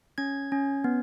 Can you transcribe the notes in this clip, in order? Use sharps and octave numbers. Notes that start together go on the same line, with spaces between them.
C#4 G#6
C#4
B3